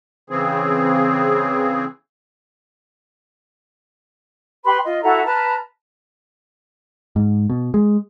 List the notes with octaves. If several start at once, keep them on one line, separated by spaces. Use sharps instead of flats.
C#3 E3 C4 G#4
G4 B4 B5 C6
F4 D#5
E4 F#4 A4 A#5
B4 A5 A#5 F6
G#2
B2
G#3